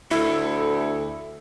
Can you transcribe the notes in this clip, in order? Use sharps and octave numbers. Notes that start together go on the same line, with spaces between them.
D2 E4 A4